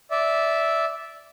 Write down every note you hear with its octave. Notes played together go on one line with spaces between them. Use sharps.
D5 E5